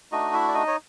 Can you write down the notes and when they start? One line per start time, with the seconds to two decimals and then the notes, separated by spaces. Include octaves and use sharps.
0.12 A3 D4 D#4 F#4 D#5
0.33 E4 E5
0.48 D5
0.54 D#4 D#5
0.67 C#5